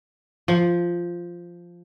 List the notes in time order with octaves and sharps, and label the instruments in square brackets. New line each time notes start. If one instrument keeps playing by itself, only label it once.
[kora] F3